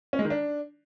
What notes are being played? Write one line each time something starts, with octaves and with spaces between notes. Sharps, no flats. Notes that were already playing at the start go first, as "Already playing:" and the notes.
C#4
G#3
D#3
D4